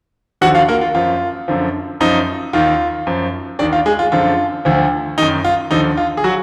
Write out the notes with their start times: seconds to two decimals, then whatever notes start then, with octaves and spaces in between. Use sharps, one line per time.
0.41 D#2 D3 F3 F#4 F#5
0.55 F4 F5
0.68 A#3 A#4
0.81 F4
0.94 F#2 F3 F4
1.48 F#2 D3 F3
2.00 F#2 F3 D#4
2.53 D#2 D#3 F4
3.07 F#2 F3
3.59 D#2 D#3 D4 D5
3.72 F4 F5
3.86 G#3 G#4
3.99 F4
4.12 F#2 D3 F3 F4
4.65 D2 D3 F3
5.18 F#2 D#3 D#4
5.44 F4
5.71 D#2 D3 F3 D#4
5.97 F4
6.17 G#4
6.24 F#3 F#4